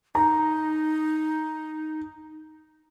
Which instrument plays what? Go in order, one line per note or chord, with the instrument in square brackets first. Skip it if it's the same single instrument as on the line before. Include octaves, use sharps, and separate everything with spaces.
[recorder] D#4 [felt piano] A#5